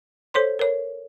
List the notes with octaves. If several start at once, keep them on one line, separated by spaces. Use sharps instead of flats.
A4 C5 C#5 C6
A#4 C#5